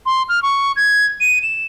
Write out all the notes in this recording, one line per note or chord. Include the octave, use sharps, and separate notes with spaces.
C6
F6
C#6
G#6
D#7
E7